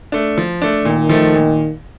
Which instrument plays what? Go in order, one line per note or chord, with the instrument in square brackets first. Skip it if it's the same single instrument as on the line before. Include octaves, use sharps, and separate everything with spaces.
[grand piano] A3 D4
F3
A3 D4
[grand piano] A#2 [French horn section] D#3
[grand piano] F3 A3
A#2